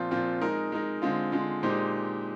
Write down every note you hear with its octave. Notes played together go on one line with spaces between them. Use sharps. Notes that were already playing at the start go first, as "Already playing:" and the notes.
Already playing: A#2 F3 C4 F4
A#2 F3 C4 F4
G#3 D#4 A#4
G#3 D#4 A#4
D3 G#3 C4 F4
D3 G#3 C4 F4
A#2 G#3 D#4 G4 C5